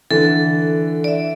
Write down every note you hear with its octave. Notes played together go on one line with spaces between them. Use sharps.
D3 E3 A4
D5 E5